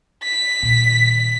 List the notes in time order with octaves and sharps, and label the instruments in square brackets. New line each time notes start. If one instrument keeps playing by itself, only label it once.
[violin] B6
[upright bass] A#2 D#3